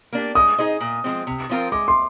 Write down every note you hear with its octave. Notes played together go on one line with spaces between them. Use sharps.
A#3 D4 G4
G#3 D#6
D#4 G#4 C5 D#5
A#2
F3 G#3 C4
C3
F3 C4 F4 A#4
G#3 D6
C6